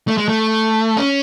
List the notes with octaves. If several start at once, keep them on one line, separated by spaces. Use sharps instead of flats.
A3
G#3
A3
C#4